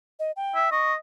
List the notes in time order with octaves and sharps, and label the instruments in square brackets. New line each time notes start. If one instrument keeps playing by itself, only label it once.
[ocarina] D#5
G5
[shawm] E5
[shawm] D#5 [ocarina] C#6